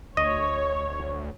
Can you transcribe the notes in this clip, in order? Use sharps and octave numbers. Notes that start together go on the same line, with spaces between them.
D2 C#5 D#5